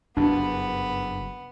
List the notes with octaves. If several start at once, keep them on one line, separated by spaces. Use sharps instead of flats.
F#1 G2 B3 D4